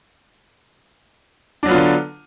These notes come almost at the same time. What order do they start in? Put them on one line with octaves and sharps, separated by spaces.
D4 F#3 B3 F4 D3